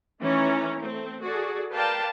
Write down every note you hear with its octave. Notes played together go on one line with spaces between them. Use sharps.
D#3 E3 A3 C#4 C#5 A#5
A3 C4
F#4 G#4 A4 D5
A#4 B4 D5 F5 G5 A5